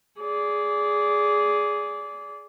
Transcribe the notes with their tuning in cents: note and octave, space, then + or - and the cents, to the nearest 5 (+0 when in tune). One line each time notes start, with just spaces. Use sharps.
G#4 +0 D5 -20